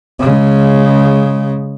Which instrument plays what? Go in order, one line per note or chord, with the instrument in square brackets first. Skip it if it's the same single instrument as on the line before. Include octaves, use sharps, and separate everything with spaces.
[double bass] C#3 G#3